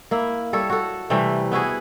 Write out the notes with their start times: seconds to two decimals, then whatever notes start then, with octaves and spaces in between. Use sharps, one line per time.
0.11 A#3 E4
0.53 G3 A4 C#5
0.70 F#4 A4
1.10 C3 E3 G3 A3
1.51 B3 E4 F#4 G#4